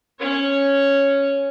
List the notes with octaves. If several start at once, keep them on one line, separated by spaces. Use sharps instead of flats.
C#4 C#5